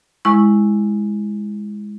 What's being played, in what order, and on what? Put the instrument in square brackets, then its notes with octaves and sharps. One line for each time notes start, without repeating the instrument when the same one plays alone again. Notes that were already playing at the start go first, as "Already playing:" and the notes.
[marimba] G#3 E4 C#6